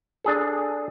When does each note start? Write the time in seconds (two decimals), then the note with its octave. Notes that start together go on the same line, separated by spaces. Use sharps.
0.24 D4 G#4 A4